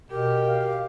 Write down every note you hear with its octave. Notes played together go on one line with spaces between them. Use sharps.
B2 G4 A#4
F5